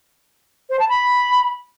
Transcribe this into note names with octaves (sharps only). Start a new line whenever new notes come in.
C5
A5
B5